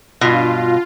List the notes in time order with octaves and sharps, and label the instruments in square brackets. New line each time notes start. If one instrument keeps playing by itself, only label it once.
[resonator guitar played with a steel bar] G2 B2 [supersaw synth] F4